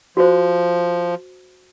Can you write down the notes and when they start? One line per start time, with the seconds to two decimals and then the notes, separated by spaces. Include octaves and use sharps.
0.17 F3 F#4 C5